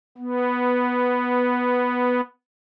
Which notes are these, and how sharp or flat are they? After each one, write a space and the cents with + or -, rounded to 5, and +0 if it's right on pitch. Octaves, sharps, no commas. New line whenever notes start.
B3 +0